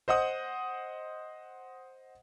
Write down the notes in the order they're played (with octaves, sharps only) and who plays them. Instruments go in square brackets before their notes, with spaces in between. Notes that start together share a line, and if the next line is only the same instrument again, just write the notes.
[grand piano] C5 D#5 F#5 D#6